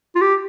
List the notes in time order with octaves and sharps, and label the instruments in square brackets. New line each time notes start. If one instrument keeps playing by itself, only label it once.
[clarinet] F4
G4